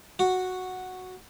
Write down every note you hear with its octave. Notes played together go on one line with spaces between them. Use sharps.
F#4